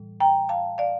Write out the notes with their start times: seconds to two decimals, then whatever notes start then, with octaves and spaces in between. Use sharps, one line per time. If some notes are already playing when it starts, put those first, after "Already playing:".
Already playing: A2 E3 G3
0.20 G5 A#5
0.49 F5 A5
0.78 D5 F5